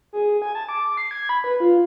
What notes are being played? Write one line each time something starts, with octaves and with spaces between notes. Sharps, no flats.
G#4
G#5
A5
D6
C7
G#6
B5
B4
F4